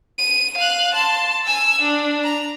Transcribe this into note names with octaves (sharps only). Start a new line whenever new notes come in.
D#7
F5 F#6
A5 C6
G#5 E6
D4
A#5